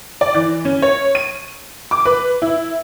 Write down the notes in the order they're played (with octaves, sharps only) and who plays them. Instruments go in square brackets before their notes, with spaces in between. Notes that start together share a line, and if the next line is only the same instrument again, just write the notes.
[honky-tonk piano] D5
E3
C#4
C#5
D#7
D6
B4
E4